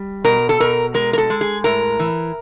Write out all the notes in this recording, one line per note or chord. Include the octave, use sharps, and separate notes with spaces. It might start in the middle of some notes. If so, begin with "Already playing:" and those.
Already playing: G3
B2 A#4
A4
B2 A#4
G#3 A#4
A#4
A4
G#3
G#4
A2 A#4
E3